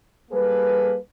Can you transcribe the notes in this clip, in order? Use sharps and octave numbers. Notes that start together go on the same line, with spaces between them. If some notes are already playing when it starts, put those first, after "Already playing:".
G3 A#3 G#4 A4 B4